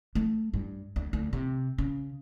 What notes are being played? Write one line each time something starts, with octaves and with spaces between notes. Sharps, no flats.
A3
G2
D2
D2
C3
C#3